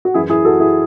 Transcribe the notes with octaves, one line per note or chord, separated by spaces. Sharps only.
F#4
F#2 E3 E4 G#4
E4 G#4
F#4 A4
E4 G#4